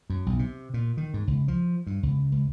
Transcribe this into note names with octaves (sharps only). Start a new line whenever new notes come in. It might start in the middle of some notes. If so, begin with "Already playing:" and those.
F#2
B1
C3
A#2
D#3
G#2
C#2
F3
G2
C#2
C#2